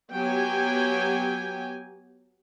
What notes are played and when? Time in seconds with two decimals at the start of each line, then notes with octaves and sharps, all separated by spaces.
0.13 F#3 B3 G4 G5 G#5